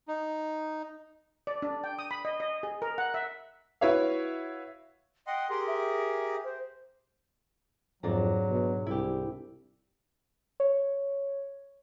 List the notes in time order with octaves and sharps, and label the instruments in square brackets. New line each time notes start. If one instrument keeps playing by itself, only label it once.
[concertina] D#4
[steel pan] D5
D4
G5
D#6
B5
D#5
D#5
G#4
A#4
F#5
E5
[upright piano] E4 F#4 B4 C#5 E5 F5
[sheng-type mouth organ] D#5 F#5 C6 [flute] G5
[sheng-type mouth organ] G4 G#4 A#4 [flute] C6
[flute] E5
C5
[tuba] F2 [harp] G#2 D4 A#5 [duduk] F#3
[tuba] B2
[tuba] C2 [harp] E4 G4
[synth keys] C#5